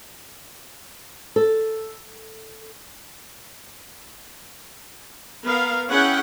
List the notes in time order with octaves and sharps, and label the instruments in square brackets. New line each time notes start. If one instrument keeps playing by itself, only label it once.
[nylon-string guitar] A4
[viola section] B3 A#4 F5
C#4 E4 G#4 F#5 G5